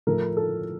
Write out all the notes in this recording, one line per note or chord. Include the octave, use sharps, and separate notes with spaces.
A2 F3 A3 A#4
A4